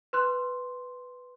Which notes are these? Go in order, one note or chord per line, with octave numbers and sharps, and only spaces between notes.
B4 C6 F#6